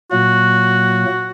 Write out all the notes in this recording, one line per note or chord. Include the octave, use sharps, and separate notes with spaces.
A#2 F#3 A#3 F#4